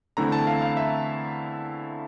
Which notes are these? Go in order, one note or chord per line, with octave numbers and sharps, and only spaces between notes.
E2 D3 A3 C4 E4 A#5
A5
F5
F5
E5